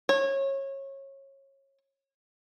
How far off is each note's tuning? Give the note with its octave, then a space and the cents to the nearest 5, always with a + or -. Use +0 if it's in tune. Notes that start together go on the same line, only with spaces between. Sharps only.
C#5 -25